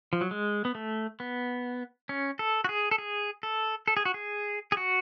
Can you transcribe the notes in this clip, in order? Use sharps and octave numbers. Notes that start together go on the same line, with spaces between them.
F3
F#3
G#3
B3
A3
B3
C#4
A4
F#4
G#4
A4
G#4
A4
A4
G#4
F#4
G#4
G#4
F#4